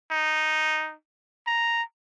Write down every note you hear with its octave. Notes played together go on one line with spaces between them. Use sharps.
D#4
A#5